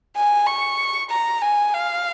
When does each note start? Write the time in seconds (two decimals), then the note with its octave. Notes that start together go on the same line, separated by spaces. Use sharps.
0.16 G#5
0.47 C#6
1.10 A#5
1.42 G#5
1.74 F5